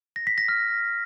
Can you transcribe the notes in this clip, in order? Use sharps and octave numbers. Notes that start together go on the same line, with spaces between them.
A#6
B6
A#6
F6